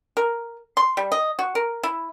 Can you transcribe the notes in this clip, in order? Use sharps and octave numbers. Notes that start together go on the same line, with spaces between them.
A#4
C6
G3
D#5
F#4
A#4
E4